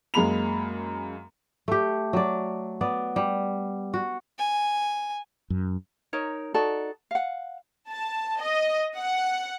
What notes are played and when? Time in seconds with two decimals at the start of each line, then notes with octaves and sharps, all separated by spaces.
0.14 F#2 G#3 A#3 B5 F7
1.68 A3 G4
2.13 F#3 D5
2.81 B3 D5
3.16 G3
3.94 F#4
4.39 G#5
5.50 F#2
6.13 D#4 A#4 C#5
6.54 D#4 F#4 A4 D5
7.11 F5 F#5
7.89 A5
8.40 D#5
8.96 F#5